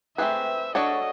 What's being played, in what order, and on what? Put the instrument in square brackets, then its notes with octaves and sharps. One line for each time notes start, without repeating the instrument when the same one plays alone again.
[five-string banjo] A3 C4 F4 G#4 B4 [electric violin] E5
[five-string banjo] D4 F#4 A4 C#5 [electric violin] D#5